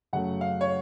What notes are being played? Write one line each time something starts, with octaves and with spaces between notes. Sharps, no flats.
F#2 C#3 F#3 A3 F#5
F5
C#5